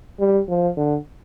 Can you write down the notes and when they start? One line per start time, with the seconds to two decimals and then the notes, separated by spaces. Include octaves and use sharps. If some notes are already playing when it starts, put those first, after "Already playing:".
0.19 G3
0.49 F3
0.77 D3